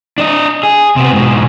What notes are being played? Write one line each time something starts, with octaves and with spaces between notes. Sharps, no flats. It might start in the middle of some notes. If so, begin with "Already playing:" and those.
D4 D#5
G#4
C3 B3
G#2 B2